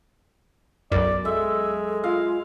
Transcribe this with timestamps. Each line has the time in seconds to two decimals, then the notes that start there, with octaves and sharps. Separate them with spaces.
0.91 B1 F#2 D5
1.25 G#3 A4 E5
2.04 F4 F5